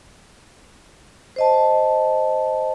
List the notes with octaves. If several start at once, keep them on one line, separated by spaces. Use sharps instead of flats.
C5 D#5 A5